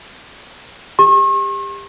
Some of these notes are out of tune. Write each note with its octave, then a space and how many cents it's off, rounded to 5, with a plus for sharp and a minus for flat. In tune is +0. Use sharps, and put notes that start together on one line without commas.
G4 +30 C#6 -45